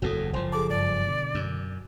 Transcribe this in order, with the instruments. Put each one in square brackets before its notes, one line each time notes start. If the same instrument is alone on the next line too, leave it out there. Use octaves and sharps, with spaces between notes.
[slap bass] F#1 E2 A2 [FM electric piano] F#4 A4 D#6
[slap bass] F#1 F3 [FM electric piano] C5 C6
[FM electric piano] G#4 A4 A5 [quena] D6
[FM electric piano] G2 [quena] D5
[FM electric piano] B2 D3
[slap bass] F#2